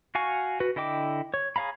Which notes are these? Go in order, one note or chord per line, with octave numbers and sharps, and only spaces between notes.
F#4 F5 G#5 C#6
F#4 B4
D3 E4 D#5 G5 D6
C#5
G#4 C#5 F5 A#5 B5